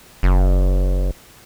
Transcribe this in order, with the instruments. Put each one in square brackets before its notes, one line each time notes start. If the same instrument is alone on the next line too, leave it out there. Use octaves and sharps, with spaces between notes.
[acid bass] F#1